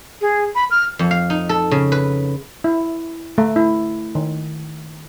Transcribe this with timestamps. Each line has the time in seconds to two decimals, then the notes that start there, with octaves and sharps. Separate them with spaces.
0.21 G#4
0.55 B5
0.71 F6
0.99 F2
1.11 F5
1.30 D#4
1.49 A4
1.71 C#3
1.92 B4
2.64 E4
3.38 A3
3.56 E4
4.15 D#3